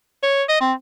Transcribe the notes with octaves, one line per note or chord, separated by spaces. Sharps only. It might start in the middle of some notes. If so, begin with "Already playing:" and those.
C#5
D#5
C4